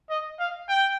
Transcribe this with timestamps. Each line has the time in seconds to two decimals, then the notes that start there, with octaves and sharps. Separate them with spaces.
0.10 D#5
0.39 F5
0.69 G5